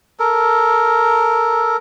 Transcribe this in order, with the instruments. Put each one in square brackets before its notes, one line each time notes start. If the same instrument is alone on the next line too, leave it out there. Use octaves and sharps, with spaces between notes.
[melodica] A4 A#4